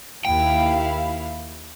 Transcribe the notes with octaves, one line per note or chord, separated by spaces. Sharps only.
D#2 E4 F5 G5